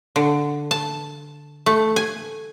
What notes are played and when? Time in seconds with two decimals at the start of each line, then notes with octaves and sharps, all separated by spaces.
0.16 D3
0.71 A5
1.66 A3
1.96 G#5